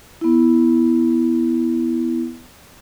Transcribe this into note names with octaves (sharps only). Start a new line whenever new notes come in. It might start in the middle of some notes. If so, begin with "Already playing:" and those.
B3 E4